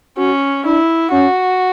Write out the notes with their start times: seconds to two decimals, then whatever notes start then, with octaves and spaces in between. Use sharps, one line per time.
0.17 C#4 F#4
0.64 D4 E4
1.11 C#4 F#4